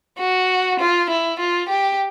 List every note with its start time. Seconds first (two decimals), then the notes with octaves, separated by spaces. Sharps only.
0.19 F#4
0.80 F4
1.10 E4
1.40 F4
1.69 G4